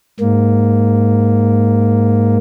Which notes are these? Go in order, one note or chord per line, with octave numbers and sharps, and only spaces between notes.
G#2 A#3